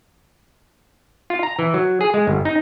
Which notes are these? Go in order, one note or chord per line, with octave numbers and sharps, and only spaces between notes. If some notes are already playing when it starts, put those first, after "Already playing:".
F4
A#5
E3
F#3
G#4
G#3
G1
D#4